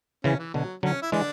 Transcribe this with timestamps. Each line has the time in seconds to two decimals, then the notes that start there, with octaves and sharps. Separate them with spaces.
0.24 C#3 E3 C#4
0.39 E3
0.54 B2 D3 F#3
0.83 D3 F#3 C#4
1.02 E4
1.12 D3 E3 G#3 D4